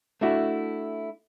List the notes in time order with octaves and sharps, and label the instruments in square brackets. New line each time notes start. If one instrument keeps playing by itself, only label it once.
[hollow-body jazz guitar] A3 D4 E4 F#4